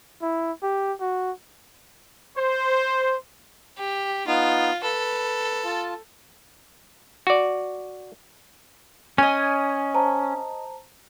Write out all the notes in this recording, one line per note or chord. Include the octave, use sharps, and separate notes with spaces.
E4
G4
F#4
C5
G4
B3 D#4 F4
A4 B4
F4 A5
F#4 D5
C#4 D#5 G#5
C5 A5 A#5